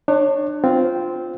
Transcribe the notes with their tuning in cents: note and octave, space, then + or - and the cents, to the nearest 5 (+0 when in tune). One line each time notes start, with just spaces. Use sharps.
D4 +30 C#5 -10
C4 -10 F4 +0